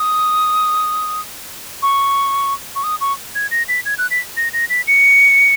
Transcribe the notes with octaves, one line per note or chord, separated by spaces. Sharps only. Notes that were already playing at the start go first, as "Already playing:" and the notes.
Already playing: D#6
C#6
C#6
D#6
C#6
G#6
A#6
B6
G#6
F#6
B6
A#6
A#6
B6
C#7